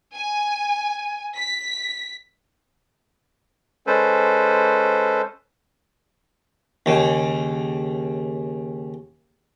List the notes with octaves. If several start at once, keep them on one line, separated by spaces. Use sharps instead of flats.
G#5
B6
G#3 C#4 A4 B4 C5
D#2 C#3